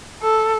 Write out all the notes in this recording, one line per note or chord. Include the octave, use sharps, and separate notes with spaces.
A4